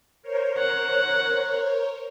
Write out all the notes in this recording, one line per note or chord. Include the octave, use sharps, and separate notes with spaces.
A#4 C5 C#5
F#5